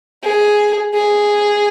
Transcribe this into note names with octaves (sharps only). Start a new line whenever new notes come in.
G#4
G#4